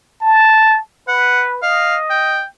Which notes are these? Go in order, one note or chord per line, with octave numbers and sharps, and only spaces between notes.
A5
B4 F#5
D#5 F5
G5